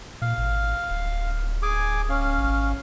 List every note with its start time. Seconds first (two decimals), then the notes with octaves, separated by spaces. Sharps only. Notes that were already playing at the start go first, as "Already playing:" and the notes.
0.22 A#2 F5
0.38 G#1
0.90 D1
1.62 G#4 G#5 D6
2.10 C#4 F5
2.37 G#1